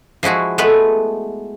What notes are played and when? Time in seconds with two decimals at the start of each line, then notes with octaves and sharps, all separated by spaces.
0.23 F3 G#3 E4 F#4 G#4
0.58 G#3 A3 B3 B4